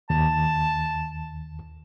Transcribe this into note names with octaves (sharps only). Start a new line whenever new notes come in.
D#2 A5